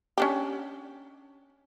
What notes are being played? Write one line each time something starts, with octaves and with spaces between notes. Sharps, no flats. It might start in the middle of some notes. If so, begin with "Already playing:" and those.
C#4 D4 G4